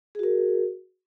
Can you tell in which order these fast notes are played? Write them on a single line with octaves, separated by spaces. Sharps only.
G#4 F#4 A#4